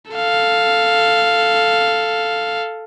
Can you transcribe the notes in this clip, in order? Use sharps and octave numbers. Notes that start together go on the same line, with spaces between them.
A4 F5